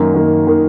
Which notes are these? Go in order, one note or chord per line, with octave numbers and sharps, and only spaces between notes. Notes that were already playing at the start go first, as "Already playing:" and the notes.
Already playing: F#2 D#3 A#3
F#2 D#3 A#3
D#3 A#3